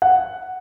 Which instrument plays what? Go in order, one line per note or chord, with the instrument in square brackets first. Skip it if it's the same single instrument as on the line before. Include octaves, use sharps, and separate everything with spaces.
[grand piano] F#5